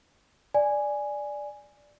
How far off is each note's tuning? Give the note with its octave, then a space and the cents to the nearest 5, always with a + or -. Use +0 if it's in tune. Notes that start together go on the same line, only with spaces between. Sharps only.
D5 +0 G#5 +0